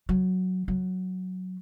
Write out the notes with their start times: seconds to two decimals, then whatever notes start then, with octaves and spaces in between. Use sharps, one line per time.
0.09 F#3
0.68 F#3